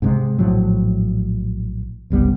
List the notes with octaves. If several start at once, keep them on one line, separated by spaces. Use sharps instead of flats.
G#2 C3 G#3
A#1 A2 F3 F#3
F#1 C2 G3 B3